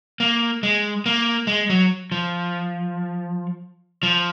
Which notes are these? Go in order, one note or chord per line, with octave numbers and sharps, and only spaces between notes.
A#3
G#3
A#3
G#3
F#3
F3
F3